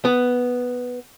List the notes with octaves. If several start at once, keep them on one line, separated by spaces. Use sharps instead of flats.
B3